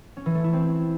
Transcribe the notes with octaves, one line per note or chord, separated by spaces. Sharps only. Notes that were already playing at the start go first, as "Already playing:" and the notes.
C#4
E3
A3
E4
C4